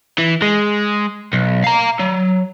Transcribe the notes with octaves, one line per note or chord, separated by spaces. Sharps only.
E3
G#3
B1
F5 A#5
F#3